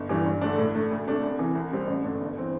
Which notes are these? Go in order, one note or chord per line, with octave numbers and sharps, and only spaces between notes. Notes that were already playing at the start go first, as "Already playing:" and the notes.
Already playing: G1
G2 E3 G3 D4
G2
D3 A3 D4
A2
A3 D4
D2
C3 A3 D4
C2
C3 E3
C2
C3 G3 C4
A1
G2 D3 A3 D4
G1
E3 C4